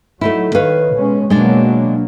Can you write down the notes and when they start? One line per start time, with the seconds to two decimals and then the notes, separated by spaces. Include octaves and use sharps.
0.21 F#3 A3 D#4 E4
0.55 D#3 B4 C#5 F5
0.95 B2 G#3 C#4
1.30 B2 F#3 G#3 A#3 D4